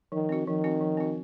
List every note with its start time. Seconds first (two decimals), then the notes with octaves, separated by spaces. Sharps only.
0.12 D#3 F3
0.29 C4 F#4
0.47 D#3 F3
0.64 C4 F#4
0.81 F3
0.97 C4 F#4